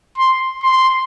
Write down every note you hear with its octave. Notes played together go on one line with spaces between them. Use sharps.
C6
C6